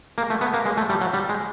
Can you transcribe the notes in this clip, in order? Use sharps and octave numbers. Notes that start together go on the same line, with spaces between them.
A#3
A3
B3
A#3
G#3
A3
G3
F#3
G3
G#3